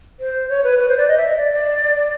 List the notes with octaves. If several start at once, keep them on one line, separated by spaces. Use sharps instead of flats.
C5
C#5
B4
B4
C5
D5
D#5
E5
D#5
D5
D5
D5